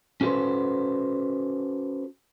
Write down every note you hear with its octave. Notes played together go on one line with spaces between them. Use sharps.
C#4 F#4 A4 B4 C5